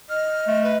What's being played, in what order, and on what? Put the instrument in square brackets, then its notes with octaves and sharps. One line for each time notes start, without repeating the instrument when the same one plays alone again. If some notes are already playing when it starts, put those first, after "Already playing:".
[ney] D#5 [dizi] F6
[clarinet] A3
[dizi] B4